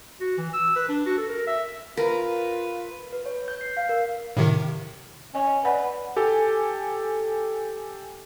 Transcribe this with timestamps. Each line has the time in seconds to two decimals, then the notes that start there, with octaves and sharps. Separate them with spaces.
0.20 F#4
0.38 E3
0.53 E6
0.76 B4
0.89 D4
1.06 F#4
1.18 A4
1.29 A#4
1.47 E5
1.97 F4 A#4 B4
3.13 B4
3.26 C#5
3.48 G6
3.61 C7
3.77 F5
3.89 A#4
4.37 A2 C3 D#3
5.35 C#4 D#5
5.65 B4 D5 F#5
6.16 G4 A4 G#5